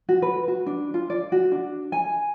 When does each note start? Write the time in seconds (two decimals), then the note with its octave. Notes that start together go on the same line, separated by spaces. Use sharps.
0.09 F#4
0.22 B4
0.48 F#4
0.67 D4
0.94 F4
1.10 D5
1.32 F#4
1.52 D4
1.92 G#5